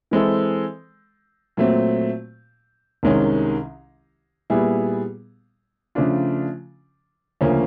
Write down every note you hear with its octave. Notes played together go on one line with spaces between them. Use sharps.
E3 G#3 C4 E4 A4
A#2 F#3 A3 C4
C2 C3 D#3 G#3 C#4
A#2 G3 B3 E4 G#4
C#3 F3 A3 D4 F4
D2 C#3 F3 A#3 C#4